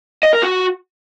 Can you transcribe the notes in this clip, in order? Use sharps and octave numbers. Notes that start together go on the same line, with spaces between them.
D#5
A#4
F#4